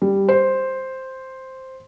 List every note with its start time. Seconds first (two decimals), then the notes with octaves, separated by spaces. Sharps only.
0.02 G3
0.28 C5